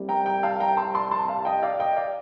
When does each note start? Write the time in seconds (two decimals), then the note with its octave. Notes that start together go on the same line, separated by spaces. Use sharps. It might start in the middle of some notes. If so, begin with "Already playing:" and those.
Already playing: C2 C3 G3
0.09 G5 A#5
0.26 G5 A#5
0.43 F5 A5
0.60 G5 A#5
0.77 A5 C6
0.94 A5 C6
1.11 A5 C6
1.28 F5 A5
1.45 D#5 G5
1.63 D5 F5
1.80 D#5 G5
1.97 D5 F5